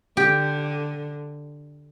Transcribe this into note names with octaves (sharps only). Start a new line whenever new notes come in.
D3 G4